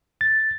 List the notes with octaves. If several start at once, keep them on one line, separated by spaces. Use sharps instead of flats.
A6